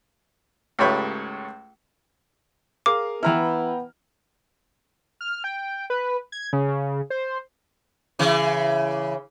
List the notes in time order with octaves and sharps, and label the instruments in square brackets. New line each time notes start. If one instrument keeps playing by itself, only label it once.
[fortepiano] C#2 G#2 A3 G4 C#5 B5
[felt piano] G#4 A#4 F5 [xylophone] D6
[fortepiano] E3 E4 [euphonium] B3 [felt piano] G5 A#5 F6
[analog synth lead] F6
G5
B4
G#6
C#3
C#3
C5
[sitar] C#3 E3